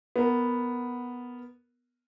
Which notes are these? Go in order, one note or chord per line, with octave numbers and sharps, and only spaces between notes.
B3 A#4